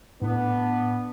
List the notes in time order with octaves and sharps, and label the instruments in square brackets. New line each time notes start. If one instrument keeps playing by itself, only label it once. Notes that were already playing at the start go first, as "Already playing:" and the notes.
[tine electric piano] A2 [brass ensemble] B3 D4